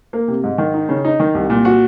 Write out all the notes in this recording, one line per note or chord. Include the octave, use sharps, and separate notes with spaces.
A#3
C3
G#2
D#3
D#4
C#3
D#4
D#3
C2
A#2
F#4